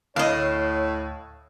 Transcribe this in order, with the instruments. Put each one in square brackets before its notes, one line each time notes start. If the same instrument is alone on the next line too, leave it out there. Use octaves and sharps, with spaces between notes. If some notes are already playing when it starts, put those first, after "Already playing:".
[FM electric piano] D2 E6 F#6 [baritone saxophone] A2 [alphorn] C#5 [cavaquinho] D#5 F5